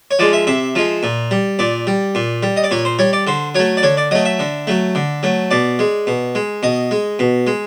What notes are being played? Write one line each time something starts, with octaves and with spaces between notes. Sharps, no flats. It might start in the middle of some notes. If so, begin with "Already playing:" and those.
C#5
F3 G#3 D5
E5
C3 E5
F3 G#3
A#2
G3
A#2 D5
G3
A#2
G3
D#5
D5
A#2 C#5
C5
G3 C#5
D5
D3 C5
F#3 A3 C#5
D5
D3 C#5
D5
F#3 A3 D#5
E5
D3
F#3 A3
D3
F#3 A3
B2 D5
G#3
B2
G#3
B2 D#5
G#3
B2
G#3